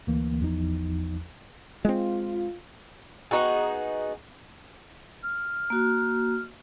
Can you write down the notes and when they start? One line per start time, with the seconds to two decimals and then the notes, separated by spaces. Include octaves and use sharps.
0.07 D2 E3 A#3
0.40 G#1 E2 F3 D#4
1.85 G#3 C4 F4
3.31 B3 D#4 F#4 G#4
5.23 F6
5.70 A#3 F#4